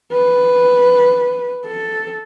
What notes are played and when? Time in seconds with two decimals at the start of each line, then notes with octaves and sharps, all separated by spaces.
0.12 B4
1.66 A4